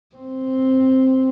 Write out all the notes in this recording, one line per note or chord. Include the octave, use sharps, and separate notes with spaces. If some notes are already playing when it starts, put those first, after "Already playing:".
C4